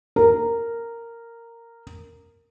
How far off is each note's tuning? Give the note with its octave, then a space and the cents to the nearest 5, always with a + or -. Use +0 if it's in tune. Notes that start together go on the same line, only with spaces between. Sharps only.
A#4 -10